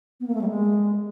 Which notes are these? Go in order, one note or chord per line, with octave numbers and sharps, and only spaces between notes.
B3
A#3
A3
G3
G#3